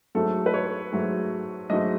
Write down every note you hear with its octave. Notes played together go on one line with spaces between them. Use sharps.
G#2 F#3 A3 A4
B4
C#5
G#2 F#3 A3
G#2 F#3 A3 D#5